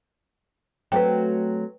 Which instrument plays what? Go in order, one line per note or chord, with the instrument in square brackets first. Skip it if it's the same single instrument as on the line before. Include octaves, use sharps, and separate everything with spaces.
[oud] F#3 A3 C4 [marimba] B4 G5